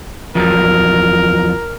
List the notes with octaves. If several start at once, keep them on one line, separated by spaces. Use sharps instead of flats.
E2 F3 F#3 A#4